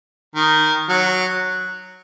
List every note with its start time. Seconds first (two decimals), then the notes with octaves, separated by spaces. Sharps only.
0.36 D#3
0.89 F#3